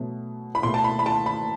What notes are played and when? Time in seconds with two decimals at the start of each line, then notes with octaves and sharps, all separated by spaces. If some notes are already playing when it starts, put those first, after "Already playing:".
Already playing: B2 F#3 A3
0.55 B5
0.63 B2 A3 C6
0.74 A5
0.84 B5
0.99 B5
1.06 A5
1.26 B5